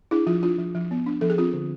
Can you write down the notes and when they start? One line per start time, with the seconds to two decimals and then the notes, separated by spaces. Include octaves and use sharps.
0.11 D4 E4 G#4
0.27 F3 F4
0.42 D4 F4
0.58 F3
0.75 F3
0.91 B3
1.06 D4
1.21 F3 A4
1.30 G#4
1.38 C4 F4
1.53 D3